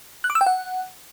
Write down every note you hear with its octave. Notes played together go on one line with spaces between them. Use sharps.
F#6
D6
E6
G5
F#5